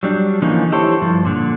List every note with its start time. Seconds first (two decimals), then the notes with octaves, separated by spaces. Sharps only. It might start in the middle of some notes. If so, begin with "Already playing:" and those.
0.03 F#3 G3 D4
0.42 D3 E3 F3 A#3 C#4 D#4
0.72 E4 G4 A4 C5 C#5
1.01 G2 F3
1.25 A#2 D3